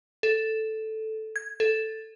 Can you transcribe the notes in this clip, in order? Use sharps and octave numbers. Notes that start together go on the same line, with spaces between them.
A4
G#6
A4